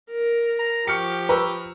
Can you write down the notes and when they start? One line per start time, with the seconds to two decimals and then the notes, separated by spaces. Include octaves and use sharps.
0.11 A#4
0.59 A#5
0.87 F3 G4 C#6 F6 C#7
1.29 B4 A#5 C#6 E6